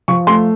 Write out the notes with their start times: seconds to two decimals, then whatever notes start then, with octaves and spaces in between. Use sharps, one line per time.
0.08 F3 C#6
0.27 A3 C6